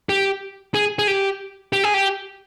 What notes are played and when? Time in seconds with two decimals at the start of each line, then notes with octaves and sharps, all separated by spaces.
0.09 G4
0.74 G#4
0.99 G#4
1.08 G4
1.73 G4
1.84 G#4
1.94 G4